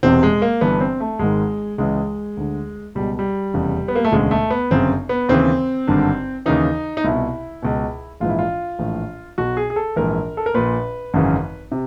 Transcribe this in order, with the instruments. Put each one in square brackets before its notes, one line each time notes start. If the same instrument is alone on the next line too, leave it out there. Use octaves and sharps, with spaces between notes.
[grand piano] E1 E2 C3 C4
G#3
A#3
G1 G2 E3 B3
C4
A3
G#1 G#2 D#3 G#3
C#2 C#3 E3 G#3
D2 D3
C#2 B2 G3
G3
F1 E2 C#3
B3
A#3
A3
E1 D2 C#3 G#3
A3
B3
G1 F#2 C#3 C4
B3
D#2 C#3 E3 C4
G#1 G2 D3
D#2 C#3 E3 D#4
D#4
C2 B2 E4
C#2 B2
A#1 G#2 E3 F4
E4
F4
A#1 A2 E3
B1 B2 F#4
G#4
G#4
A4
A#1 G#2 E3 A#4
A4
A#4
A#1 A#2 B4
G#1 F#2 C#3 E3
C3